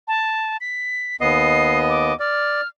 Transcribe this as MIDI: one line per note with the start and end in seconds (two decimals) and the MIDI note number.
0.08 0.57 81
0.61 1.16 95
1.21 2.14 39
1.21 2.14 59
1.21 2.14 75
1.21 1.78 96
1.89 2.18 86
2.20 2.61 74
2.20 2.68 89